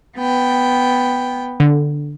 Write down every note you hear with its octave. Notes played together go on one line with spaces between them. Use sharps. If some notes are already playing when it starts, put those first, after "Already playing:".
B3 G5
D3